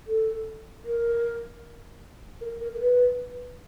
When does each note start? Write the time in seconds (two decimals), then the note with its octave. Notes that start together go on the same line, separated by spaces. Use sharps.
0.06 A4
0.84 A#4
2.40 A#4
2.60 A#4
2.74 A#4
2.80 B4